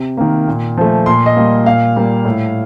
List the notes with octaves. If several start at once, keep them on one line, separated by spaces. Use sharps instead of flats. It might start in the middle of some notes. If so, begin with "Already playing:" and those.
Already playing: C3
D#3 A#3
A#2
F3 A3
A#2 C6
D#5
G3 A#3
A#2 F5
G3 A#3
A2